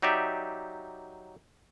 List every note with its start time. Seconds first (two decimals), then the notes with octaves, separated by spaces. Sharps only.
0.02 F#3 D#4 G4 D5 E5